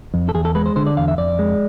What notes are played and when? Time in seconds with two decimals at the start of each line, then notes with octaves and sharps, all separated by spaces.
0.14 F2
0.29 A4
0.34 E2 G#4
0.45 A4
0.55 G#3 B4
0.66 C5
0.76 D3 C5
0.86 D5
0.97 E2 F5
1.08 E5
1.18 F2 D5
1.39 G#3